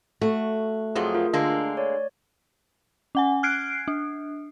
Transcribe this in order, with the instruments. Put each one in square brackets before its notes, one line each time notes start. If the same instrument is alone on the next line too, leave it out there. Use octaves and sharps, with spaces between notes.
[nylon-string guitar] A3 [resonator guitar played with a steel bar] F#4
[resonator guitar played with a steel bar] F2 F3 F#3 [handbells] G#4
[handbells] F4 A#4
[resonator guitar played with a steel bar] D3 G#3 A#3 [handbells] D4
[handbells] C#5 D5
[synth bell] C#4 F#5 G#5
F6 F#6 G#6 C7 D7
D4